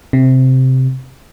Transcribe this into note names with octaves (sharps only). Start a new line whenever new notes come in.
C3